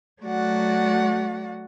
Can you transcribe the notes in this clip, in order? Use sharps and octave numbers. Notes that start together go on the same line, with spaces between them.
F#3 A3 F#4 D5 F#5